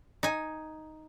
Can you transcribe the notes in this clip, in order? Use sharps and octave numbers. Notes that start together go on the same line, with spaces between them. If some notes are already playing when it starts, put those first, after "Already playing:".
D#4 G#5